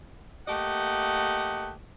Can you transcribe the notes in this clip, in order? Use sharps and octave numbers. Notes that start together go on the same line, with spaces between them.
A3 A#3 G4 D#5 F#5